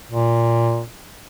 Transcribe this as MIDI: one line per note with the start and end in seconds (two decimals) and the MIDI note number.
0.11 0.83 46